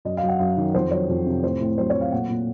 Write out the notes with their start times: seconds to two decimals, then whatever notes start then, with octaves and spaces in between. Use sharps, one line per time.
0.05 F#2 D#5
0.17 F5
0.23 F#3
0.29 F#5
0.39 F#2 F5
0.57 D#3
0.74 F2 C5
0.91 F#3 C#5
1.09 F2
1.26 C3
1.43 A2 C5
1.61 A2
1.77 F#3 C5
1.90 C#5
1.95 F#3
2.01 F5
2.12 A#2 F#5
2.29 A#2